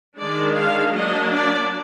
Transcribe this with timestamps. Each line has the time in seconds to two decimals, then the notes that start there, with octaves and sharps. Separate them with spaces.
0.18 D#3 G#3 D4 D5
0.56 F5
0.94 F#3 A#3 D4 D#5
1.31 D5